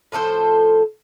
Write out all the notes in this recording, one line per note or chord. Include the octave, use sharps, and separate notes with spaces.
A2 F3 A4 C5